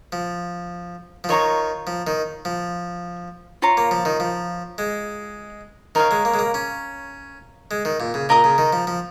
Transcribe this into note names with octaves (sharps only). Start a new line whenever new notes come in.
F3
F3
D#3 F4 C#5 A#5 C#6
F3
D#3
F3
F4 C#5 A#5
A#3
F3
D#3
F3
G#3
D#3 A#4 C#5 F5
G#3
A#3
G#3
A#3
C#4
G#3
D#3
A#2
C#3
A#2 A#4 D#5 A#5 D#6
C#3
D#3
F3
F3